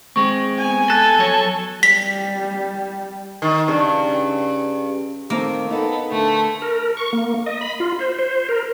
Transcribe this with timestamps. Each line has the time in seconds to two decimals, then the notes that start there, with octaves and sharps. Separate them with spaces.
0.16 G#3 C4 C#6
0.58 B3 G#5
0.90 A4 F#6 G#6
1.19 F#3 C#5
1.83 G3 B6
3.42 D#3
3.68 G2 C#3
5.30 D#3 A3 A#3 C4
5.70 B3 D#4 A4
6.11 D3 A3
6.62 A#4
6.97 C#6
7.13 A#3
7.46 D#5
7.61 B5
7.80 F4
7.99 C5
8.19 C5
8.49 A#4